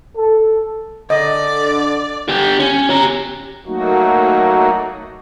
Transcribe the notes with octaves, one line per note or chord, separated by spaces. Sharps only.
A4
D3 D5 D#5
D3 G4
C#4
G4 A#5
F#3 A3 A#3 D#4 F#4